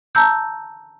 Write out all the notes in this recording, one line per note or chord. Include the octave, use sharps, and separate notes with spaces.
A5 A#5 E6 G6